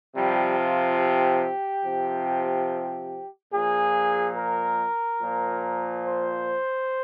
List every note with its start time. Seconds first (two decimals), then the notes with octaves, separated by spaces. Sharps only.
0.16 C3 F3 G3
0.59 F4
1.00 G4
1.85 C3 F3
3.52 A#2 F3 G#4
4.37 A#4
5.21 A#2 F3
6.05 C5